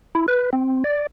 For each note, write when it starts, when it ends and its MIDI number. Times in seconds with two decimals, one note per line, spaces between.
0.15 0.26 64
0.28 0.50 71
0.53 0.84 60
0.84 1.07 74